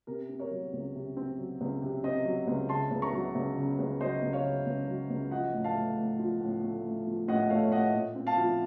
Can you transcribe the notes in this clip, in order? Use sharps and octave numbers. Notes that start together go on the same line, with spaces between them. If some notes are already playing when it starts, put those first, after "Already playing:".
C3 A#4
C4
A#4 C#5
F#3
C#2
C3
C4
F#3
C#2
C3
C4 C5 D#5
F#3
C#2
C#3 A5 C6
C#2
A#5 C#6
F#3
C#2
C#3
C#2
F#3 C5 D#5
C#2
C#5 F5
C#3
C#2
F#3
C#2
F3 D#5 F#5
A2
F5 A5
A3
A2
F3
A2
A3
A2
F3
A2 D#5 F#5
A3 C#5 F5
A2 D#5 F#5
A#2
C4
F5 A5
F3